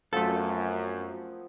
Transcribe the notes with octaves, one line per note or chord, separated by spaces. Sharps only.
F#2 F3 A3 B3 C4 A4